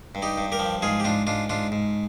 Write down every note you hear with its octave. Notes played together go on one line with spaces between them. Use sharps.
G2
D#4 G4
G2
G4 A#4
F3
G#2 F4 G#4
G4
G#2 D4 F4
G#2 D4 F4
G#2 D4 F4
G#2